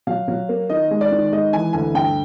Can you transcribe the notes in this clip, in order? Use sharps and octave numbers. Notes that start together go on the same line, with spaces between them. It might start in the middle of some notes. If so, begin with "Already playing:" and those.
F#3 F5
F#3
A#3
D#3 D#5
G#3
D5
D#3
G#3 D#5
E3 G#5
D2 G#5
G2 G5